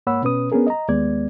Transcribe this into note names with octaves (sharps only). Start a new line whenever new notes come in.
G#2 A#3 C#5 F#5 B5 E6
B2 C#4 B4 D#6
B3 C#4 D4 G#4 A#4
D#5 A#5
D#2 G#3 B3 D5 G#6